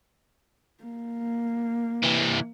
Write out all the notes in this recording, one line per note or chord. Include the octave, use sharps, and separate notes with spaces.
A#3
C3 E3